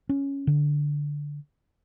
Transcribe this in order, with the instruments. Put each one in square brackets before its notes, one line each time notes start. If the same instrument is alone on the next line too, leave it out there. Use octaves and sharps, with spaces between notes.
[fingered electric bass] C#4
D3